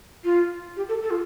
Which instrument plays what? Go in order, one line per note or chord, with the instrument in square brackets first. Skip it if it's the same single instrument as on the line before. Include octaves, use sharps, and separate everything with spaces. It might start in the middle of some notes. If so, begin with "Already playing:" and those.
[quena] F4
G4
A4
A4
F4